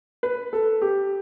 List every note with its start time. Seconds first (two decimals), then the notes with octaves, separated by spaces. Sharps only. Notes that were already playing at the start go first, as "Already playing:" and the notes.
0.23 B4
0.53 A4
0.81 G4